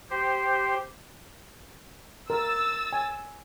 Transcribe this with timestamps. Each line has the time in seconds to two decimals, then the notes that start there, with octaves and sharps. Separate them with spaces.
0.10 G4 C5
2.30 A#4 E6 A6
2.93 G#5